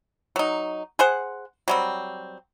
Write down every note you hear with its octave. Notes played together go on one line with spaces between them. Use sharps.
F#3 D#4
G#4 C5 F#5
F#3 G3 C4